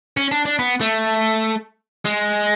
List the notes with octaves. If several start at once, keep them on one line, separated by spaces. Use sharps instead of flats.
C#4
D4
D4
B3
A3
G#3